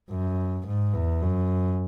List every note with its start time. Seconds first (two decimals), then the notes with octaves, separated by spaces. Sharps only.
0.11 F#2
0.66 G#2
0.94 E2
1.22 F#2